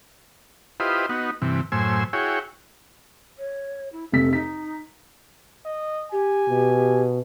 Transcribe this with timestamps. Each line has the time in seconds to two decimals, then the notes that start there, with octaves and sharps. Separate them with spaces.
0.80 E4 F4 G4 B4 C5 D#5
1.09 B3 D#4 F#4
1.42 G2 C3 E3
1.72 F#2 A2 C5 G#5 E6
2.13 E4 F#4 G#4 C#5 G5
3.38 C#5
3.93 E4
4.12 F1 C3 A4 B6
4.33 D#4 B6
5.66 D#5
6.12 G4 G#5
6.49 B2